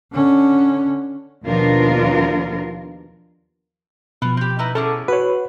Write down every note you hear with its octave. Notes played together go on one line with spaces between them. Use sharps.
D3 C#4
D#2 B2 F3 D4 F4 A#4
B2 F3 B3
C4 G4
D#4 E4 B4
C#4 E4 G#4 A4 A5 D6
F#4 B4 C#5